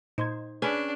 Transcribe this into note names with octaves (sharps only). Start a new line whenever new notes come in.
A#2 D#4 C5 C6 G#6
C#4 D4 G#4 B4 B5